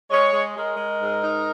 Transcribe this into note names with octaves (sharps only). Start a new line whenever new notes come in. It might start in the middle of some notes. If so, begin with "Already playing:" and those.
G#3 C#5
G#3
G#3 A#4
G#3
G#2
D#4